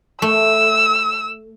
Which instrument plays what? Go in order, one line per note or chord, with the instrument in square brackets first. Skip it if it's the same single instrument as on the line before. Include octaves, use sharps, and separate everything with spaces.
[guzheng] A3 [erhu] E6